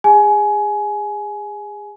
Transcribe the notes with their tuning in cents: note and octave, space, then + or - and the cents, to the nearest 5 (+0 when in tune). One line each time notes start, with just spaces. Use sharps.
G#4 -30 G#5 +20